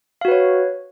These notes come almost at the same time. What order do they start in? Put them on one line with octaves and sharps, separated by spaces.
F5 F#4 B4 C#5